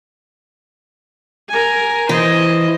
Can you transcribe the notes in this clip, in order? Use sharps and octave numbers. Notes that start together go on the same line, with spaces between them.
A#4 G#5
E3 C5 D#5